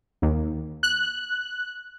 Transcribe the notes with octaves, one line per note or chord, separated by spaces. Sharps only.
D#2
F#6